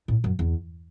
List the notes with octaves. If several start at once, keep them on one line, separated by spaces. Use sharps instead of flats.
A2
F#2
E2